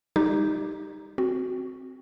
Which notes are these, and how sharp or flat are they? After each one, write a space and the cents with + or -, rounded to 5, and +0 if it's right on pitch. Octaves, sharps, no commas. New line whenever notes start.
G3 +35 D#4 +0 G4 +0
C4 +0 F#4 +0